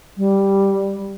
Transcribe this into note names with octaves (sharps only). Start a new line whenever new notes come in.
G3